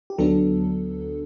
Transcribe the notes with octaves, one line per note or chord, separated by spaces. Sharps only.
G4
D2 D3 F#3 B3 D4 A4